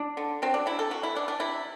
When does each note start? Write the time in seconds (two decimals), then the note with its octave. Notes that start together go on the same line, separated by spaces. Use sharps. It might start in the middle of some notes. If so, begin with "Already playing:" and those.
Already playing: D4
0.17 D3
0.42 F#3 C4
0.54 D4
0.66 C3 E4
0.79 A4
0.91 E3 F#4
1.03 E4
1.15 E3 D4
1.28 D4
1.40 C3 E4